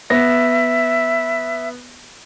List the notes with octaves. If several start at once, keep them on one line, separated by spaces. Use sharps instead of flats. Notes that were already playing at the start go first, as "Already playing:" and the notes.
B3 E5 A#6